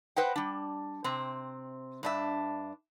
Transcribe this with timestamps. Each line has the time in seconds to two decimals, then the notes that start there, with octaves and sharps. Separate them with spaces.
0.16 B4 C5 D#5 F#5 G5
0.36 G3 D4
1.04 C3 C4
2.03 G2 D4 E5